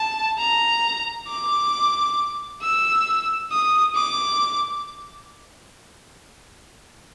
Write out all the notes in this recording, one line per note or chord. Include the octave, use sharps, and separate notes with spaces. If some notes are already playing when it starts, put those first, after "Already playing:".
Already playing: A5
A#5
D6
E6
D#6
D6